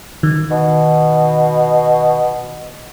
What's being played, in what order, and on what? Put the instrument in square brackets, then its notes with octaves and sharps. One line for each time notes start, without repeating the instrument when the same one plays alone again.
[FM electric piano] D#3
[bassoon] B2